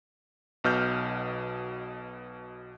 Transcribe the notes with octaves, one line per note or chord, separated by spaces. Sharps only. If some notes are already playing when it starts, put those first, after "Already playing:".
B1 B2 F6 G6